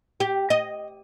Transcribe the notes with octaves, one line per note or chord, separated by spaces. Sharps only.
G4
D#5